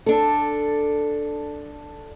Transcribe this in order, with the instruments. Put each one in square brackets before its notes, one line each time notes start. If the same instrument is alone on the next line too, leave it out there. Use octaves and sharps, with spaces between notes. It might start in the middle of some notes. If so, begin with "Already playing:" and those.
[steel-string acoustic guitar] D4 A4